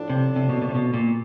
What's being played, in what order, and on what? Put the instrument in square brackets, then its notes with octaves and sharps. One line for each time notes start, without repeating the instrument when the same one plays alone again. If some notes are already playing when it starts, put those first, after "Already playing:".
Already playing: [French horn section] A2 F3 A3 D4
[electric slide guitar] C3
C3
B2
B2
C3
B2
A#2